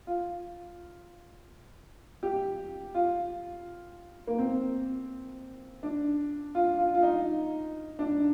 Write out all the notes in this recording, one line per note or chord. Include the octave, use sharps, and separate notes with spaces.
F4
G4
F4
A#3
C4
D4
F4
F4
F4
D#4
D4